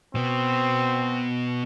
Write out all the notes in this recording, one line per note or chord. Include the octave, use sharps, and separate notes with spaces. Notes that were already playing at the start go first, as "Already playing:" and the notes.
B2 B3 C4